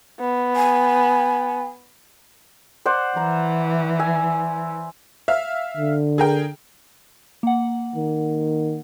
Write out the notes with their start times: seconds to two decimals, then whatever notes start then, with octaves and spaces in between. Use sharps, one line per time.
0.20 B3
0.56 G#5
2.86 C5 D5 F#5
3.17 E3 A#5
3.99 E5 G#5
5.28 E5 F5 F6
5.77 D3
6.18 G#4 A#4 G5
7.43 A#3 F#5
7.95 D#3